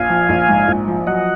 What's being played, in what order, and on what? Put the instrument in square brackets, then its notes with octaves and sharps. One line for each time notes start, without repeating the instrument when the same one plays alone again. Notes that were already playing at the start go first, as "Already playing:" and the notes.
Already playing: [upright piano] A#1 [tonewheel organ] F5 G#5
[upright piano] F3
A#1
G#2
A#1
F3
[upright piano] F#3 [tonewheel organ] D#5 F#5